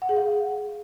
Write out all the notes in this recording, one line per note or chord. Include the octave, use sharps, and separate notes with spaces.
F#5
G#4
F5